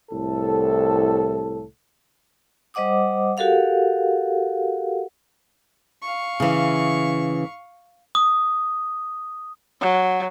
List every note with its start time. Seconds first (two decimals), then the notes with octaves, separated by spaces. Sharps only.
0.11 C2 A2 A4
2.74 G3 C5 D#5 F#5 D6 D#6
3.37 F#4 G4 A4 A#4 F5 F#5
6.02 F5 C#6
6.40 C#3 E3
8.15 D#6
9.81 F#3